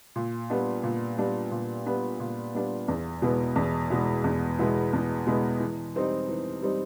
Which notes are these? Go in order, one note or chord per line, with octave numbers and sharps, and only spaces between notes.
A#2
G3 B3 D4
A#2
G3 B3 D4
A#2
G3 B3 D4
A#2
G3 B3 D4
E2
B2 G#3 B3 E4
E2
B2 G#3 B3 E4
E2
B2 G#3 B3 E4
E2
B2 G#3 B3 E4
E3
G3 C4 D#4
E3
G3 C4 D#4